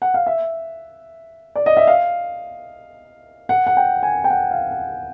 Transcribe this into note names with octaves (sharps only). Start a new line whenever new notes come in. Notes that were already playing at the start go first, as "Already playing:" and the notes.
F#5
F5
E5
D5
D#5
E5
F5
F#5
F#5
G5
G#5
G5
F#5
F5
F#5